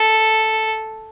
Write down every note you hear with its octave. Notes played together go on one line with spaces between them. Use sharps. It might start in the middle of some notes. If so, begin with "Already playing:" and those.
Already playing: A4